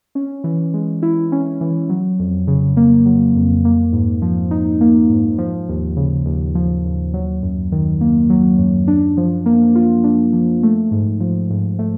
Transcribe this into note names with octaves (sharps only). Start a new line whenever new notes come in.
C#4
E3
G#3
E4
C#4
E3
F#3
F2
C#3
A#3
F#3
F2
A#3
G#2
F3
D#4
A#3
G#2
F3
D#2
C#3
D#2
F3
D#2
F#3
F#2
D#3
A#3
F#3
F#2
D4
F3
A#3
F4
D4
F3
A3
G#2
F3
G#2
A3